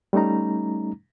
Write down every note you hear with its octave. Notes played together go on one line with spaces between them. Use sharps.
G3 A3 C#4 D#4 A#5